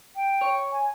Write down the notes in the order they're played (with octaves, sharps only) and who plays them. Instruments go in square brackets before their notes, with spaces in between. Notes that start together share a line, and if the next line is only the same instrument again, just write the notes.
[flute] G5
[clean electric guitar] C#5
[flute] G#5